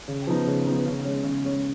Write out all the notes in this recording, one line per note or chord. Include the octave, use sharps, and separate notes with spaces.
C#3
F3 B3 D#4
C#3
F3 B3 D#4
C#3
G#3 C#4
C#3
G#3 C#4